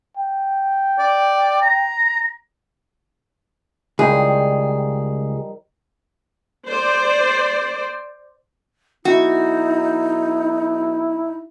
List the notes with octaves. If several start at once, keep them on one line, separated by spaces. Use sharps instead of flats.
G5
D5
A#5
C#2 D#3 F3 G3 G#4
C5 D5
B1 D#4 E4 F#4